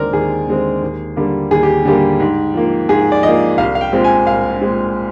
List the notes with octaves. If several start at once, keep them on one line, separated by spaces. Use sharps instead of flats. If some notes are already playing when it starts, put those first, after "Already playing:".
Already playing: D#2 D3 G#3 C4 A#4 D5
D#2 G#4
D3 G#3 C4
D#2
D3 G3 A#3
D#2 G#4
G4
D3 G3 A#3 G4
G#2
F3 A#3
G#2 G#4
D5
F3 A#3 D#5
C2 F5
F5
G5
A#2 G#3 C4
G#5
C2 F5
A#2 G#3 C4